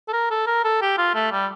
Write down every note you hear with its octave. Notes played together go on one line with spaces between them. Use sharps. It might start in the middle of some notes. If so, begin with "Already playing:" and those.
A4
A#4
A4
A#4
A4
G4
F4
A3
G3